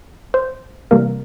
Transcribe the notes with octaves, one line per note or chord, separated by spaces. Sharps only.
C5
C3 E3 G3 A#3 A#4